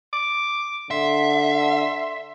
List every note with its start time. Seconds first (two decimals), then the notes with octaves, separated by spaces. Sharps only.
0.13 D6
0.91 D3 E5 C6